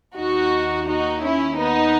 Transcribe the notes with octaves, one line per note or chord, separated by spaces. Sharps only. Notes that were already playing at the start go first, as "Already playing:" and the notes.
D#2 D#3 D#4 F#4
D#4 F#4
C#4 E4
B3 D#4